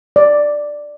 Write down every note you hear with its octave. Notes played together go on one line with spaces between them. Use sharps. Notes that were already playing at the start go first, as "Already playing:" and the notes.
D5